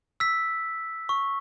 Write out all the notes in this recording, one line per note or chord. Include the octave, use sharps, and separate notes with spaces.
E6 B6
C#6